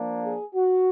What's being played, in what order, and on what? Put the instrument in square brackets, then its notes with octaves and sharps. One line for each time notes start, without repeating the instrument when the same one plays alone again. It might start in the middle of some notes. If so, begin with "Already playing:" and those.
Already playing: [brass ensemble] F3 A#3 D4
G#4
F#4